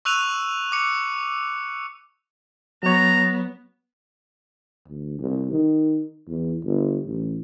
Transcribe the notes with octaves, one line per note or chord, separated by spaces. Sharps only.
C#6 E6 F#6 D#7 F7
D6 C#7
F#3 B3 C#5 A#5
D2
C2
D#3
E2
G1
A1